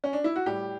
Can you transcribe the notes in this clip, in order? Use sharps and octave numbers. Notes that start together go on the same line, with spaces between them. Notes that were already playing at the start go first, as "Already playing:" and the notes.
C#4
D4
E4
F#4
A2 G3 G4